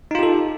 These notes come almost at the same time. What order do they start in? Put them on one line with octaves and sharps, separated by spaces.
D#4 F4 G4 A4